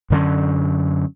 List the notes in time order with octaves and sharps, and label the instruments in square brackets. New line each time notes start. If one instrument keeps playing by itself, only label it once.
[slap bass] F#2 D3 F#3 C#4